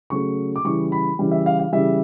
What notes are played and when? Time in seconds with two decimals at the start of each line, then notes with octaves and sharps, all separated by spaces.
0.10 C#3 F#3 A3 C#6
0.56 D6
0.65 C#3 E3 G3 C#6
0.92 B5
1.19 C#3 E3 G3
1.31 E5
1.46 F5
1.59 F5
1.73 C#3 E3 G3 E5